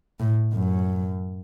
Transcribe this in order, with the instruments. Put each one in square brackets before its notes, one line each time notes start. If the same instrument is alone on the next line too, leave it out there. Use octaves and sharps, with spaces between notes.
[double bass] A2
F#2